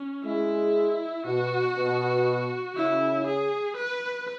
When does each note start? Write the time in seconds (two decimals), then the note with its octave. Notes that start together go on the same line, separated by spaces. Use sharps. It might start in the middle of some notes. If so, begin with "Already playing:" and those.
Already playing: C#4
0.25 G#3 E4
1.26 B2 F#4
1.76 B2
2.76 C#3 E4
3.27 G#4
3.77 B4